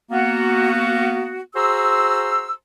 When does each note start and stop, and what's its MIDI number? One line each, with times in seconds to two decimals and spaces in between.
0.11 1.41 58
0.11 1.41 59
0.11 1.41 66
1.55 2.53 66
1.55 2.53 68
1.55 2.53 72
1.55 2.53 82
1.55 2.53 84
1.55 2.53 88